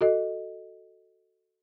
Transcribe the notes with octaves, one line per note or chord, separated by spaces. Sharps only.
F#4 A4 D#5